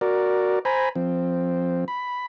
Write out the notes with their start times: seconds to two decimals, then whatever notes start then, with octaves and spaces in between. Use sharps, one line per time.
0.01 F#4 A#4 D5
0.65 C5 G#5 A#5 B5
0.95 F3 C4
1.88 B5